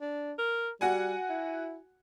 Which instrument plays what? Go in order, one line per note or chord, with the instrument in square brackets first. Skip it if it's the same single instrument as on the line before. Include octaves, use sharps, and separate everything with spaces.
[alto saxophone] D4
A#4
[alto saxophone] G3 [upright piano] F#4 F#5 G#5
[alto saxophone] E4